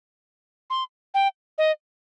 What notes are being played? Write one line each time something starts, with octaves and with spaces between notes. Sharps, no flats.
C6
G5
D#5